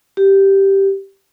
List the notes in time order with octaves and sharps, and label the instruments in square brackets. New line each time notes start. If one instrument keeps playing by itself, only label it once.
[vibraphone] G4